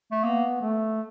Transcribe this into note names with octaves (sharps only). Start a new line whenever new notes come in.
A3
A#3 B3
A3